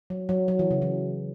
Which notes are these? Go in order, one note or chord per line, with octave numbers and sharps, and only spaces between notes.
F#3
F#3
F#3
E3
C#3
E3